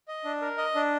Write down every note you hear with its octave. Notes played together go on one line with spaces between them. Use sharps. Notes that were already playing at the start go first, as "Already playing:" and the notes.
D#5
D4
A#4
D#5
D4